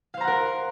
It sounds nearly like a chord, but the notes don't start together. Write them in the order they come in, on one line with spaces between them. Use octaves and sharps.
F5 C5 A#5 F#5 A#4